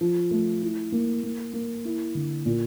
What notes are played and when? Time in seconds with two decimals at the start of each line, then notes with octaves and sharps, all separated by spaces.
0.01 F3
0.31 A3
0.62 E4
0.92 A#3
1.23 A#3
1.53 A#3
1.85 E4
2.15 D3
2.46 A#2